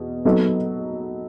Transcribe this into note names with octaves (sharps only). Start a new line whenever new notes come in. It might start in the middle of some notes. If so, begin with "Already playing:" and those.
Already playing: E2 B2
F#3 B3 D#4 A4 D#5